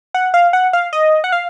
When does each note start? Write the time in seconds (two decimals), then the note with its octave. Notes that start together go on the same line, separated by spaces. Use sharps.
0.14 F#5
0.34 F5
0.53 F#5
0.73 F5
0.93 D#5
1.24 F#5
1.32 F5